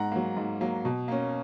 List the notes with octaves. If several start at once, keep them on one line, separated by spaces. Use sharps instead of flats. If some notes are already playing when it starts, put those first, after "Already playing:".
Already playing: G#2 F#5 A#5
F#3 A#3
G#2
F#3 A#3
B2
A#3 C#4